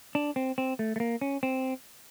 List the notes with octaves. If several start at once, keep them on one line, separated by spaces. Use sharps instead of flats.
D4
C4
C4
A3
A3
A#3
C#4
C4